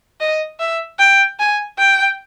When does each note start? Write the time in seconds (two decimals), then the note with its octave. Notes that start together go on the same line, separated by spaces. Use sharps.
0.20 D#5
0.60 E5
0.99 G5
1.40 G#5
1.78 G5